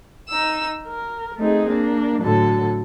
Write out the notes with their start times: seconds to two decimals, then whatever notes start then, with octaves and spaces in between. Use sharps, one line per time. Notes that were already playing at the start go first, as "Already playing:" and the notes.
0.29 D#4 E6
0.87 A#4
1.38 A3 C4 D#4 G#4
1.68 A#3 D4
2.22 A2 D3 F#3 A4